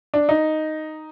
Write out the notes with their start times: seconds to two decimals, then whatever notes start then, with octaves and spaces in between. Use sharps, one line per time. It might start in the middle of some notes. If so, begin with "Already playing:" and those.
0.14 D4
0.29 D#4